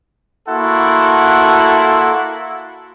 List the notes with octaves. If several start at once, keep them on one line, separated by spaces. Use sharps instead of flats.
A#3 E4 F#4 A4 F#5 C6